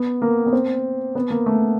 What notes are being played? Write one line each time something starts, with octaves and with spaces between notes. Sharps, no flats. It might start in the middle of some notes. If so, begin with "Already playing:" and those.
Already playing: B3
A#3
B3
C4
B3
A#3
A3